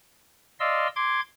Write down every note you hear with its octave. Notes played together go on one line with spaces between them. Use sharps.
D5 D#5 F5 C6 E6
C6 D6 G#6